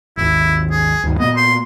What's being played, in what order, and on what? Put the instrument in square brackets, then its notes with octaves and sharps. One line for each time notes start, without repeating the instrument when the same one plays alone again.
[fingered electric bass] G#1 D#2 [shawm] E4
[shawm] G#4
[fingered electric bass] D2 G2 D#3
[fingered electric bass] A#2 A#3 B3 [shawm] D#5
[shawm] C6